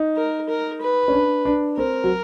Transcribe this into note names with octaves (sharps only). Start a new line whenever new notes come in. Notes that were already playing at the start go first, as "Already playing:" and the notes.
Already playing: D#4
A#4
A#4
B4
C#4
D4
D4
C4 A#4
F#3